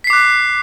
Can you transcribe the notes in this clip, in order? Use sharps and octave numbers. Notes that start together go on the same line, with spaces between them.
D6 F#6 B6 C7